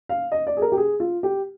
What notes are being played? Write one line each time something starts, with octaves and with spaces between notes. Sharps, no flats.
F5
D#5
D5
G#4
A#4
G4
G#4
F4
G4